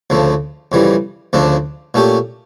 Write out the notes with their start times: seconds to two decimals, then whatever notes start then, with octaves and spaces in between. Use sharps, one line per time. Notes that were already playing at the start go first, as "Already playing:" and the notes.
0.10 D2 C#3 F3 A3
0.72 F2 C#3 E3 G3
1.33 D2 C#3 F3 A3 D4
1.94 A#2 A3 C#4 G4